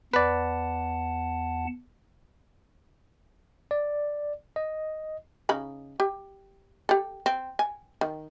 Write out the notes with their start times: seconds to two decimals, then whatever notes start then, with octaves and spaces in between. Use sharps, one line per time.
0.14 E2 B4 D5 F#5 A5
3.71 D5
4.56 D#5
5.49 C#3 D#4 B5
6.00 G4
6.89 G4 A4
7.26 C4
7.59 G#5
8.01 D#3